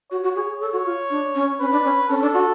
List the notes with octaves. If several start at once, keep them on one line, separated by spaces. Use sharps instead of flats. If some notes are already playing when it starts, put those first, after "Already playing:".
F#4 C#5
F#4
G#4
G#4
A4 C#5
F#4
F4
D4
C#4
C#4 B4
D4
C#4
C#4 A4
D4
F#4